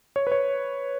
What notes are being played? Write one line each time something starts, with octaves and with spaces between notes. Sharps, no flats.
C#5
B4
C#5